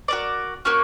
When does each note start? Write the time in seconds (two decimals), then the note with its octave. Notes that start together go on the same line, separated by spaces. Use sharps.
0.08 F#4 A#4 D5
0.65 A#3 C#4 F#4